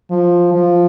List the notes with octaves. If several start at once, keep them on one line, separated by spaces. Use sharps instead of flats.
F3
F3